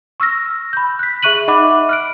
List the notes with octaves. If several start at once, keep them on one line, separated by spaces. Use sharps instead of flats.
C#6 E6 F6 A#6
B5 G6
F#6 B6
G#4 E5 C#6 F#6 D#7 F#7
D#4 D#5 E5 F#5 B5 D6
F6 F#6 D7